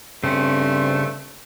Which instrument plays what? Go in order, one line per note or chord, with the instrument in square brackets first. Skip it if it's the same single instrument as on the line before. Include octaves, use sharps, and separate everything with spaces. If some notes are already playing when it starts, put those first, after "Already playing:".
[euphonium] G2 [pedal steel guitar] C#3 C#4 [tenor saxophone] A3 [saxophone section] C4